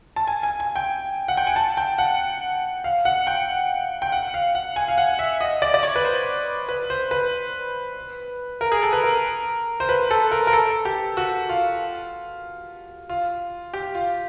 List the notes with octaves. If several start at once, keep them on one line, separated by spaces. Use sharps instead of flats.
A5
G#5
G#5
G#5
G5
F#5
G5
G#5
A5
G5
F#5
F5
F#5
G5
G5
F#5
F5
F#5
G#5
F5
F#5
E5
D#5
D5
D5
C#5
B4
C5
B4
C5
B4
A#4
G#4
A4
B4
A#4
C5
B4
A4
A#4
A#4
A4
G4
F#4
F4
F4
G4
F4